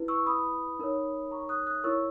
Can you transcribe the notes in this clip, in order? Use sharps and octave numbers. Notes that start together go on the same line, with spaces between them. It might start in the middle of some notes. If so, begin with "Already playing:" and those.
Already playing: E4 B4
C#6 E6
B5 D#6
D#4 A#4 C#5
A#5 C#6
D#6 F#6
D#6 F#6
E4 A#4 C#5 C#6 E6